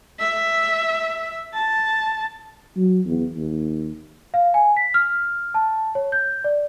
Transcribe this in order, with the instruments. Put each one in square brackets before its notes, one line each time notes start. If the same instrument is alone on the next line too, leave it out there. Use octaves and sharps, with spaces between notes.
[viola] E5
A5
[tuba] F#3
E2
D#2
[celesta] F5
G#5
B6
F6
A5
C#5
G6
D5